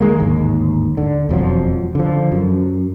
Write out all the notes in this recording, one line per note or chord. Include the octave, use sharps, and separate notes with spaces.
D#3 G#3 A#3
D1 G#1 D#2
D3
E1 F2 F3 F#3
D3 F3
F#2